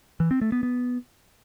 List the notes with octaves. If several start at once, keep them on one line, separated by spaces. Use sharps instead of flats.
E3
C4
A3
B3
B3